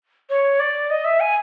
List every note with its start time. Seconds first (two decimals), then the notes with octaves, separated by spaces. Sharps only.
0.30 C#5
0.60 D5
0.90 D#5
1.05 E5
1.20 G#5